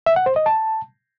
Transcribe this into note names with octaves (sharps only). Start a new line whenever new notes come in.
E5
F#5
C5
D#5
A5